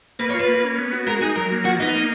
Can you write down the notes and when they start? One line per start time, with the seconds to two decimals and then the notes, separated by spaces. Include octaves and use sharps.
0.19 A#3 B4
0.30 C#5
0.34 F4
0.40 B4
0.48 A#3
0.64 C#4
0.78 B3
0.92 F#4
1.07 G#3 A#4
1.21 D#4 G#4
1.36 F#3 A#4
1.51 A#3
1.65 F3 F#4
1.80 B3 D#4
1.95 A#3